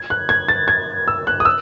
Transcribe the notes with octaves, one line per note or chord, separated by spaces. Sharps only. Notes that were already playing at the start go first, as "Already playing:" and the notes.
Already playing: G#6
F#6
G#6
A6
G#6
E6
F#6
D#6
E6